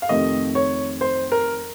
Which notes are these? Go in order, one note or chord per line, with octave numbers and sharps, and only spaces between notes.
F5
F2 C3 D#3 A3 D#5
C#5
C5
A#4